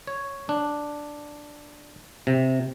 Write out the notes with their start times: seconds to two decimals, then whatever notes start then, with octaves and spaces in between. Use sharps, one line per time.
0.07 C#5
0.49 D4
2.27 C3